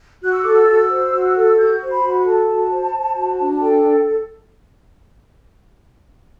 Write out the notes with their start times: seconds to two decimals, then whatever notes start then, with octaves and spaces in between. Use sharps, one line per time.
0.23 F#4 F#6
0.33 E6
0.44 A4 D6
0.54 E6
0.68 F#4
0.91 C5
1.13 F#4
1.36 A4
1.57 F#4 G6
1.80 C5
1.92 B5
2.03 F#4
2.08 B5
2.25 A4 A5
2.48 F#4
2.71 C5
2.93 C5
3.16 F#4
3.39 D4
3.61 A4 G5